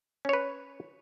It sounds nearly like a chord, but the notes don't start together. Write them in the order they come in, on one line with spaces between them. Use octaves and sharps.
C#4 C#5 B4